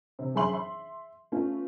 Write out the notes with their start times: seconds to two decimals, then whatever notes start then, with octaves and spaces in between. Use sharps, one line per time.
0.19 C3
0.35 F#2 G#4 E5 C6 F#7
0.51 E5 C6
1.32 A3 B3 C#4 F4